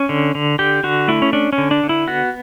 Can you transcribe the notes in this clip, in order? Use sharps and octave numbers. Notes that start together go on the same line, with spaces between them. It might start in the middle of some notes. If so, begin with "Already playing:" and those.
Already playing: C#4
D3
D3
D3 G4
D3 F#4
A3 E4
C#4
C#4 D4
C#4
D3
D4
D3
E4
B3 F#4